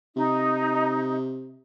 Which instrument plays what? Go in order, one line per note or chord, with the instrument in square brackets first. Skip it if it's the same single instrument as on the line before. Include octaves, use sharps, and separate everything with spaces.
[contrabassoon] C3 [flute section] D#4